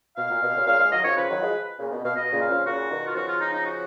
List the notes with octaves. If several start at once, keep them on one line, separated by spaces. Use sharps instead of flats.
B2 F5
A#2
B2
A#2 C#3
A#2 C#3 F5
F3 G#3 F5
D#3 F#3 D#5
C#3 F3 C#5
C#3 F3 B4
D#3 F#3
F3 G#3
A#2 C#3
B2
B2 F5
B2 D#5
A#2 C#3
F5
C#3 F3
A#2 C#3 F#4
B2 D#3
F4
C#3 F3 F#4
F4
D#4
D#4
F#4